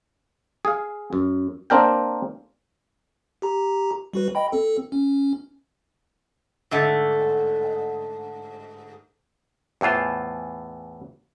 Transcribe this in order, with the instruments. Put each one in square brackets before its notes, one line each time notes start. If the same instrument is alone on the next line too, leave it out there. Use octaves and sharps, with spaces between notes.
[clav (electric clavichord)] G#4 F5
F#2
A#3 C4 D4 A#4 G5
[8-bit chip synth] G4 A#5
G3 F#4 B4
D#5 G5 B5
C4 A4
C#4
[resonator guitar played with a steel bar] G#2 D3 A3
[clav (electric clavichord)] E2 A2 E3 F4 C5